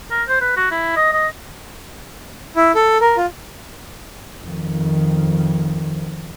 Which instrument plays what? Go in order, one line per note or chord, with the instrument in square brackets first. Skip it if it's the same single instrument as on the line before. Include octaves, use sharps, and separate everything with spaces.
[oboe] A#4
C5
B4
F#4
E4
D#5
D#5
[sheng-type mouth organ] E4
A4
A#4
F4
[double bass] F2 D#3